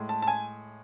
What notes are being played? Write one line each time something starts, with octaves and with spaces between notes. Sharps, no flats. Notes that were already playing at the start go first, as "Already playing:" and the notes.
Already playing: A2 G#3
A5
A5
G#5